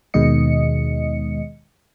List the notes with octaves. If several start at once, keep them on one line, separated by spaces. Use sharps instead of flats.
D#2 B2 D#3 G#3 D#5 C#7